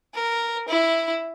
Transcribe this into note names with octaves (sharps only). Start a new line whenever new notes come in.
A#4
E4